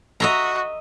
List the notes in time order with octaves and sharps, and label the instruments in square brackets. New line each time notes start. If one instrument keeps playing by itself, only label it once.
[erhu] F#4 [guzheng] D#5 E5 A#5